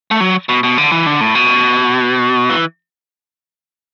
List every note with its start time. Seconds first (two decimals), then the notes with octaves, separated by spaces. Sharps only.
0.11 A3
0.21 F#3
0.49 B2
0.63 B2
0.78 D3
0.92 E3
1.06 D3
1.21 A2
1.35 B2
2.50 E3